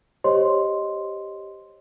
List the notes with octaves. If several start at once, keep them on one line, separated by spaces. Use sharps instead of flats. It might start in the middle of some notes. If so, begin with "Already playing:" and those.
G4 C5 C#5 D#5 C6